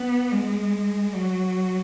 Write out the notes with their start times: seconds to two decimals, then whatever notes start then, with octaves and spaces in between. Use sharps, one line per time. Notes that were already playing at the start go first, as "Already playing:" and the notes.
Already playing: B3
0.31 G#3
1.14 F#3